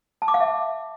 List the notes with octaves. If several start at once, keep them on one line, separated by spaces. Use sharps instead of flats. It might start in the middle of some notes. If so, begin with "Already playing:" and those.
A5
D6
F5
E5